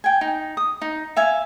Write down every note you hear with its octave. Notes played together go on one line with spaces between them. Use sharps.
G5 G#5
D#4
D#6
D#4
E5 F5 G#5